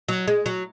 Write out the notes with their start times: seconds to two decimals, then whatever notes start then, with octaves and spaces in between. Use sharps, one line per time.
0.09 F#3
0.28 G#3
0.46 F#3